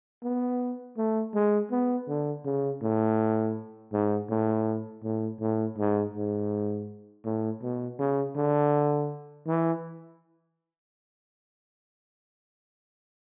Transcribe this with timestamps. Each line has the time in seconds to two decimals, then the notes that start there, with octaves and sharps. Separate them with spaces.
0.23 B3
0.97 A3
1.34 G#3
1.71 B3
2.08 D3
2.45 C#3
2.82 A2
3.93 G#2
4.30 A2
5.03 A2
5.40 A2
5.78 G#2
6.14 G#2
7.25 A2
7.62 B2
7.99 C#3
8.36 D3
9.47 E3